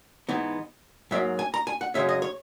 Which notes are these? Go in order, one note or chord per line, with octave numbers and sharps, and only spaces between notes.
G#2 E3 B3 D#4
G#2 F#3 A#3 E5
G#5
A#5
G#5
F#5
F#2 C#3 G#3 C#4 E5
D#5
C#5